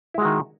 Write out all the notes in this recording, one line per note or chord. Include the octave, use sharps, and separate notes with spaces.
D#3 G#3 E4 F#4